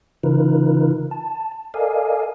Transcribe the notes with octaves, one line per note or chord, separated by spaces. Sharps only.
C#3 E3 D#4 F4 A#4 B4
A5
A4 A#4 D5 D#5 F5 G#5